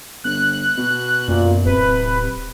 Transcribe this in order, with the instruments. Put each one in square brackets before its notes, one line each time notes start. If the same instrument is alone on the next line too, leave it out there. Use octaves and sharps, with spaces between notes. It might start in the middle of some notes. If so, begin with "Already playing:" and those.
[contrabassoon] G1 [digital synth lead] F#6
[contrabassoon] B2
[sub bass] F#2 [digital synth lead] A#2
[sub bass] D1 [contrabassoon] C3 [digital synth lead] B4